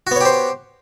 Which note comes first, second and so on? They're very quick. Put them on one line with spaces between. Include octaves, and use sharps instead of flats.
F#4 B3 C#5 G4 C5